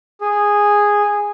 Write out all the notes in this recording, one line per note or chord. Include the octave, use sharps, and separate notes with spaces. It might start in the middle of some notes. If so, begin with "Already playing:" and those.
G#4